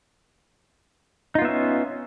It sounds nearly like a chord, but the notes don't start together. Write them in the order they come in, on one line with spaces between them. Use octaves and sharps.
D#4 F4 B3 E5 C#4